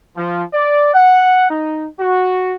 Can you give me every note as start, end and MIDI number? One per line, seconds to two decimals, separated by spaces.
0.17 0.43 53
0.53 0.91 74
0.94 1.49 78
1.50 1.88 63
1.99 2.56 66